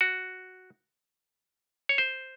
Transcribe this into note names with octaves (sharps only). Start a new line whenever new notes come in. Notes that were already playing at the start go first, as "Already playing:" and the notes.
F#4
C#5
C5